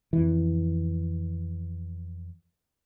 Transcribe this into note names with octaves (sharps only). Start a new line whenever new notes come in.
F2 E3